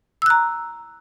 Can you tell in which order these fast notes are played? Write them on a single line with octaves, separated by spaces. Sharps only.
E6 F#6 A#5